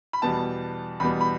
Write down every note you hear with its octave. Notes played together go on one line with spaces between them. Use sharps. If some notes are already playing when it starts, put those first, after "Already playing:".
B5
E2 B2 G3 B3 A5
E2 B2 G3 B3 B5
B5